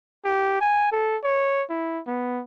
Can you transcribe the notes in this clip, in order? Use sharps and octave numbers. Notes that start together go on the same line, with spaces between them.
G4
G#5
A4
C#5
E4
B3